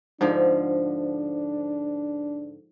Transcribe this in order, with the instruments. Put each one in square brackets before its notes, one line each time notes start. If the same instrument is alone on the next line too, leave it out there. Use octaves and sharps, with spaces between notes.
[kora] G#2 D3 F3 [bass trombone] D4